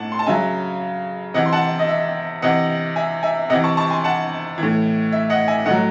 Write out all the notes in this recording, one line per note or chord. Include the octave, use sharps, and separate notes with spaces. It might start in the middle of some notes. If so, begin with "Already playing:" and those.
Already playing: A2 F#5 A5
C6
A5
C#3 F#3 E5 G#5
C3 E3 D#5 F#5
C6
F#5 A5
D#5
E5
C3 E3 D#5 F#5
E5 G#5
E5 G#5
C3 E3 D#5 F#5
A5 C#6
A5 C#6
G#5 C6
F#5 A5
A2 E3
E5
D#5 F#5
E5 G#5
A2 F#3 D#5 F#5